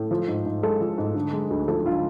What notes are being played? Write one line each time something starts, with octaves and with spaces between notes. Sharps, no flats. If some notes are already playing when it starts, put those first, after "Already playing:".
Already playing: A2
F3
G#2
G#2
G#3 A4
F3
G#2
D3
G#3
D2
F3 A4
D3 F4